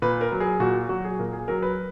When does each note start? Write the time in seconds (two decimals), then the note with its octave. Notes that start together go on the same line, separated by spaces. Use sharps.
0.02 A#2 B4
0.21 A#4
0.32 F#3
0.40 G#4
0.60 A#2 F#4
0.89 F#3 F#4
1.04 G#4
1.19 A#2 A#4
1.33 G#4
1.48 F#3 A#4
1.62 B4